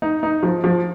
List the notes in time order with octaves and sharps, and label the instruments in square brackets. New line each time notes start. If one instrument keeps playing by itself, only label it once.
[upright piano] D#4
D#4
F3
F3